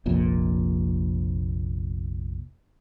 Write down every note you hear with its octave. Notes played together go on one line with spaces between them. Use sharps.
F1 A#1 A#2